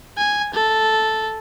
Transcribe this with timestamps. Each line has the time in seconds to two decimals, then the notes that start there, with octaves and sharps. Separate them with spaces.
0.18 G#5
0.54 A4